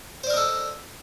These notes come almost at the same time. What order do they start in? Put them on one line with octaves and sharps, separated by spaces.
C5 D5 A#4 D#5 A4